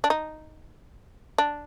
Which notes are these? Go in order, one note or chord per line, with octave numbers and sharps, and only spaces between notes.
D4
D#4
D4